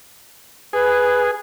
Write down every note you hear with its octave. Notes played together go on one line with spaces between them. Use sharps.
G#4 B4